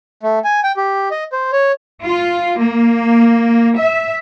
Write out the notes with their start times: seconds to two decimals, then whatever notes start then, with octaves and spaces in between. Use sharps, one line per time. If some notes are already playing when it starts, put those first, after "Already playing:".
0.23 A3
0.44 G#5
0.64 G5
0.77 G4
1.11 D#5
1.32 C5
1.52 C#5
2.02 F4
2.58 A#3
3.78 E5